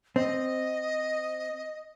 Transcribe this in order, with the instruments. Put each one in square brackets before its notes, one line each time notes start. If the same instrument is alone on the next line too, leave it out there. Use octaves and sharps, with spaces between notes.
[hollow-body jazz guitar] C4 [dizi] D#5